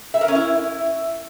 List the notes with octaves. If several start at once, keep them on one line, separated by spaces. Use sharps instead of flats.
E5
A#4
C#4
E4